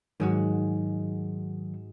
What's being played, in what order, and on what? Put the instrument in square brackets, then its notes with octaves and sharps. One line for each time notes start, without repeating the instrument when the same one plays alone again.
[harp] G#2 G#3 F#4 [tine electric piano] D#3 F#3